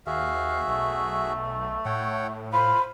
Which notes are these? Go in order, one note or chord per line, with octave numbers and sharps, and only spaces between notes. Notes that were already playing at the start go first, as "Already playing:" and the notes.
D#2 F#4 G#4 E5 F5
B1 A3
A2 C#5 F#5 G5
F4 C5 F5 B5